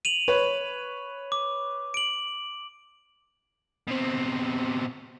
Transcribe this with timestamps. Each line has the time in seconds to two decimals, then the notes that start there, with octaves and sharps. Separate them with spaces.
0.05 D#7 F7 F#7
0.28 B4 C#5
1.32 D6
1.94 D7 F#7
3.87 B2 C4